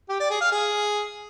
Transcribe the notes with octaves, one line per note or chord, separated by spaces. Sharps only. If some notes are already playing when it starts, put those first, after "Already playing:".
G4
D5
G#4
F5
G#4